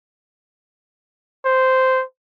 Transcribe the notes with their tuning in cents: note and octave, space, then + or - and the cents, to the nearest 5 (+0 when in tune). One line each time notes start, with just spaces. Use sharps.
C5 -10